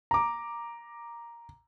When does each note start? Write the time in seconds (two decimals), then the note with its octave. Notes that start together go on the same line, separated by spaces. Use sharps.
0.11 A#5 D6